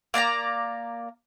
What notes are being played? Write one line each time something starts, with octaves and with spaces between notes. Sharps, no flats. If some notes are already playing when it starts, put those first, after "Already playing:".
A#3 D5 F5 A#5